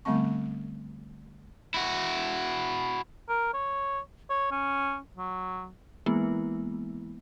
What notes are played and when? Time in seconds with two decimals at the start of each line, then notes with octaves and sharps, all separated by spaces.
0.05 D3 G3 A3 B3 C4 C#6
1.74 E4 F#4
3.29 A#4
3.54 C#5
4.30 C#5
4.51 C#4
5.16 F#3
6.06 E3 G#3 A#3 B3 E4